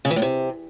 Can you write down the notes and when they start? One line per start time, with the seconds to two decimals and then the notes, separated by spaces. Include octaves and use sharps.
0.05 C#3
0.11 E3
0.16 A2
0.22 C3